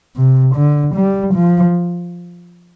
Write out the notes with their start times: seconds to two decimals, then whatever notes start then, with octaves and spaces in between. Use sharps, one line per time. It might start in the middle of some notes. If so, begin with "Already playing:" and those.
0.16 C3
0.56 D3
0.95 G3
1.34 F3